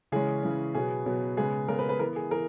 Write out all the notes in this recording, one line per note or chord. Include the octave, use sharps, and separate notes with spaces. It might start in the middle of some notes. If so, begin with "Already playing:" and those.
C#3 E3 G#3 C#4 G#4
C#3 E3 G#3 C#4
B2 F#3 B3 G#4
B2 F#3 B3
C#3 G#3 B3 G#4
C#3 G#3 B3 A#4
B4
B4
E3 B3 A#4
G#4
E3 A#4